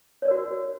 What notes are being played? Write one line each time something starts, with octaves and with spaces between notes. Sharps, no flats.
F#4 A#4 C#5 D5